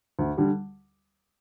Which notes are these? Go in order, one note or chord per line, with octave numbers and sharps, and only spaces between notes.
D2
D3 G3